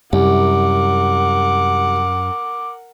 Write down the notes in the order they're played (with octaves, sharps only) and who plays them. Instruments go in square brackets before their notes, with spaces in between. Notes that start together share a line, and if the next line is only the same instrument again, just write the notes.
[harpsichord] C2 [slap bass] F#2 [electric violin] A#4 F#5 [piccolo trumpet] D6